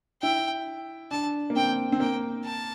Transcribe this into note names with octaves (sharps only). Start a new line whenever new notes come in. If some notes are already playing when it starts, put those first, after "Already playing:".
E4 G5
D4 A5
A#3
C4 G5
C4
A#3 G5
A5